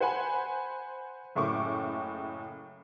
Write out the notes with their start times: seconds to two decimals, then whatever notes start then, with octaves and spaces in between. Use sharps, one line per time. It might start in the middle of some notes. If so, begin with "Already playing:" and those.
0.01 C5 F#5 G#5 B5
1.35 F#1 A2 C#3 C#6 D6